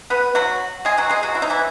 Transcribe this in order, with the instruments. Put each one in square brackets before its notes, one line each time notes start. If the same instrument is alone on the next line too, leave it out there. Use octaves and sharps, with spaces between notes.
[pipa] B3 B4
F#3 F#4
G#3 G#4
F#3 F#4
G#3 G#4
F#3 F#4
E4
D#4
E3 E4